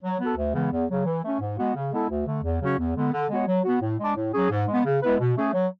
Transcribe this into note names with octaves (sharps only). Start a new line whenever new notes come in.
F#3
B3 F#4 A4
D2
C#3 E3 G#3 B3
E2
C#3 F#3
E3
A3 C#4
G#2
G#3 B3 F#4
C#3
G#3 B3 E4 A4
D2
D3 A3
E2
C#3 F#3 C#4 F#4
E2
D3 G#3 B3
D3
G#3 B3 F#4 C#5
F#3
B3 F#4
A2
G#3 D4
A2
F#3 C#4 G#4
G#2
G#3 B3
C#3
G#3 B3 E4 B4
B2
A3 C#4 G#4
F#3